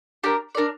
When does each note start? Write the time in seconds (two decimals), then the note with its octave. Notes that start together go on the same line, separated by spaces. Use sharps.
0.23 D4 G4 A#4
0.55 D4 A#4 D5